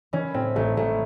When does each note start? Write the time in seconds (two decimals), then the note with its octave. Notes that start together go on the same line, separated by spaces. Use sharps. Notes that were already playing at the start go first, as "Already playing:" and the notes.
0.13 E3 C#4
0.34 A2 C4
0.56 A1 A3
0.77 A1 A3